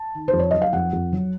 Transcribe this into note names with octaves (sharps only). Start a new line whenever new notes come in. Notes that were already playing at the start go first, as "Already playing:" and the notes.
Already playing: A5
D#3
C5
F2
C#5
F#3 D#5
F5
F2 F#5
F2
F#3